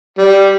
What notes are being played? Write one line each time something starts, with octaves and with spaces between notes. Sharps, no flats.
G3